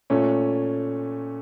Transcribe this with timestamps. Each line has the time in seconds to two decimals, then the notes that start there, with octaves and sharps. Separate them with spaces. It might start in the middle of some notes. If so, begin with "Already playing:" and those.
0.10 A#2 A3 C#4